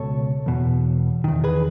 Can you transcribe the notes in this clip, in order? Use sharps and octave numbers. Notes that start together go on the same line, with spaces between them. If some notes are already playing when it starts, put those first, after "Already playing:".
Already playing: C#2 B2 A4 C#5
E2 B2
E2 D#3
G#4 B4